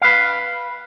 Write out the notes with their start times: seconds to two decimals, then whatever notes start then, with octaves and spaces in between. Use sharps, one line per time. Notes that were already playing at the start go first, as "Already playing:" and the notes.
0.02 B4 F5